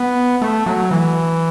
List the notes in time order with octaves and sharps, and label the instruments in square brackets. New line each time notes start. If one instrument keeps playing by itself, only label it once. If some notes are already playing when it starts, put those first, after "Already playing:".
Already playing: [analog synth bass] B3
A3
F#3
E3